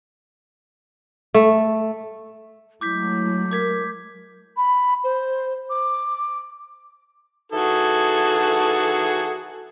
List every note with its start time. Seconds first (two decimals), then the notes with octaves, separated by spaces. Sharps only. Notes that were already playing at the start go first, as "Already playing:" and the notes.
1.34 A3
2.81 F#3 G#3 A3 E4 D6 G6 B6
3.51 A#4 D6 G#6 B6
4.56 B5
5.03 C5
5.70 D6
7.52 E3 D#4 F#4 G#4 A4